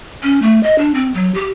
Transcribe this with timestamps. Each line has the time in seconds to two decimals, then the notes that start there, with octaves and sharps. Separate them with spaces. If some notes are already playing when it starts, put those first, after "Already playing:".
0.23 C#4
0.42 A3
0.63 D#5
0.78 D4
0.94 C4
1.14 F#3
1.34 G4